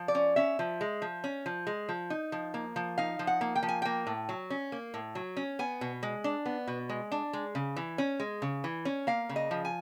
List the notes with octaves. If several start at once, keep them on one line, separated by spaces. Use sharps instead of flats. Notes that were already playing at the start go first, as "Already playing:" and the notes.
Already playing: F3
D5
C#4
C#4 E5
F3
G#3
F3
C#4
F3
G#3
F3
D#4
F3
A#3
F3
D#4 F5
F3
F#5
A#3
G5
F3
G#5
A#3 G5
A2
F#3
C#4
A#3
A2
F#3
C#4
B3 G#5
B2
G#3
D4
B3
B2
G#3
D4
G#3
C#3
E3
C#4
G#3
C#3
E3
C#4
A#3 F5
C#3
D#5
F3
G#5